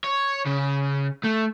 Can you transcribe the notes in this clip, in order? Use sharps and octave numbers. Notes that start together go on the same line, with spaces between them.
C#5
C#3
A3